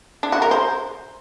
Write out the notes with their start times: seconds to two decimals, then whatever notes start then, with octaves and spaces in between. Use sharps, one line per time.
0.23 D4
0.32 F#4
0.42 A#4
0.51 C5